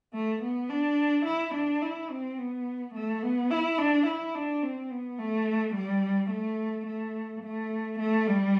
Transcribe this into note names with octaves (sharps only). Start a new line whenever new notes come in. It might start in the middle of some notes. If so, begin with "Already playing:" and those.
A3
B3
D4
E4
D4
E4
C4
B3
A3
B3
E4
D4
E4
D4
C4
B3
A3
G3
A3
A3
A3
A3
G3